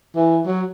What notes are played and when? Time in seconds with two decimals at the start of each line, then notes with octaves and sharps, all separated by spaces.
0.15 E3
0.46 F#3